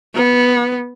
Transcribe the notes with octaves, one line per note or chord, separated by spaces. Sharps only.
B3